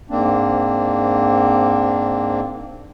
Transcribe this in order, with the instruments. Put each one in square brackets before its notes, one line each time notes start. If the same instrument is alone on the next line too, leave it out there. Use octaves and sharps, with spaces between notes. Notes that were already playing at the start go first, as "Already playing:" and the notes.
[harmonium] G#2 A#3 C4 D4